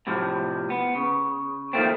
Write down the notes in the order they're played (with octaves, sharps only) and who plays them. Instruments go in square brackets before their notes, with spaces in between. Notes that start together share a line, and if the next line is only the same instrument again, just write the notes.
[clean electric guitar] A2 C3 F3
B3
C#3
D#3 F3 F#3 A3 A#3 C4